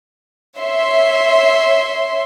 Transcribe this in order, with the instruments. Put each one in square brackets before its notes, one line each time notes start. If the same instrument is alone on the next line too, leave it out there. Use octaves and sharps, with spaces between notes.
[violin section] C#5 E5 C6